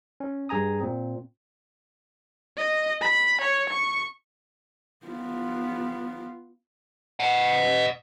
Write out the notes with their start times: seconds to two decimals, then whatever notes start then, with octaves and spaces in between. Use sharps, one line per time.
0.20 C#4
0.49 G2 G#4 G#5 A#5 D#6
0.80 A#2 C4
2.57 D#5
3.01 B5
3.41 C#5
3.69 C#6
5.06 B3 F4
7.20 D#5 F#5